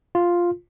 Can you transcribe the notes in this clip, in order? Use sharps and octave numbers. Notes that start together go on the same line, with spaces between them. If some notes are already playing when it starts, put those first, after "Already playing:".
F4